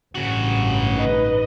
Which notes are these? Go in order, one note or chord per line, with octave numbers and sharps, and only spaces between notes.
A1 G2 C#3 F#4
D#4 B4 D#5